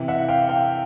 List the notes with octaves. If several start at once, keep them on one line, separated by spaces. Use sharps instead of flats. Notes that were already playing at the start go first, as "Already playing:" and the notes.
Already playing: C3 E3
E5 F#5
F5 G5
F5 G5